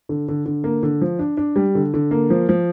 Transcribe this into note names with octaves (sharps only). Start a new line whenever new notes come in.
D3
D3
D3
A#3
D3
F3
D4
D4
G3
D3
D3
A#3
F3
F3